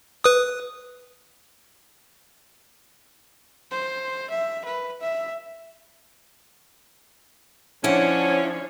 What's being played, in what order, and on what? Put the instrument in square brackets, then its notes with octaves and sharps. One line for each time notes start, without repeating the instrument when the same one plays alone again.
[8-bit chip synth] B4 D#6
[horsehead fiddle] C5
E5
B4
E5
[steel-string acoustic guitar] D3 E4 F#5 [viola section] F3 D4 C#5 [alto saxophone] C#4